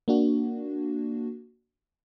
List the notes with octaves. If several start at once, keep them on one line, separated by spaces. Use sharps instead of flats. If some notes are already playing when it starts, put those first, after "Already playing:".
A#3 D4 F#4